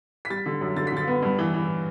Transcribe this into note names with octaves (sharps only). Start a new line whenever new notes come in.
B6
G3 A6
D3
F#2
D3 A6
B6
D3 A6
B3
G2
E3
E3